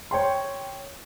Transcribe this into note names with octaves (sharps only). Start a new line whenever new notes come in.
C#5 G5 C6